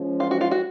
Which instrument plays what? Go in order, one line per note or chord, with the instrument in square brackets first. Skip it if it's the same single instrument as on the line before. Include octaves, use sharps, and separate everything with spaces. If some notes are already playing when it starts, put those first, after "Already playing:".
Already playing: [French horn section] F3 G#3 C#4
[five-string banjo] F4
F#4
F4
F#4